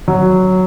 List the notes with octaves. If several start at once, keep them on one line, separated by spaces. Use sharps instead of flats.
F#3